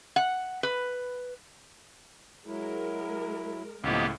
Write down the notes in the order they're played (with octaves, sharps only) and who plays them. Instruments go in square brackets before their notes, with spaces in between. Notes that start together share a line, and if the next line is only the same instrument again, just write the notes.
[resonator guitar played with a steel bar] F#5
B4
[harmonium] F#3 E4 [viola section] G#3 A#4
[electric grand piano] C#2 A2 [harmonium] D#3 F3 D#5 [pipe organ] A#3 B3 G4